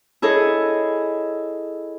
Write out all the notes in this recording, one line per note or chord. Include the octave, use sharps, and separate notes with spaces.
E4 G#4 A4 C#5 D#5